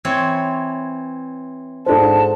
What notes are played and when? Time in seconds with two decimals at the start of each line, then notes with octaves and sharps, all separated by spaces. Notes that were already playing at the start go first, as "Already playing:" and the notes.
0.05 E3 C4 C#5
1.86 G#2 D4 F4 A4 C5 A5